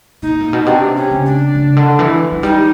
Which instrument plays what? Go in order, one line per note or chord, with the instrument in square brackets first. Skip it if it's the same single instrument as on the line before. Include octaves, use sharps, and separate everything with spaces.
[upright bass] B2 [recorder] D#4
[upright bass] A#2
B2
[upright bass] C3 [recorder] D4
[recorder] C#4
[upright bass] C#3
[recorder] D4
[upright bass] C#3
D3
E3
F#3
[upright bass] G3 [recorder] D#4